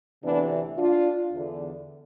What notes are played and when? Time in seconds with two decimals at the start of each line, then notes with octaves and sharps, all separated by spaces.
0.23 D2 C3 E3 B3 D4
0.77 D4 F4
1.32 E2 D3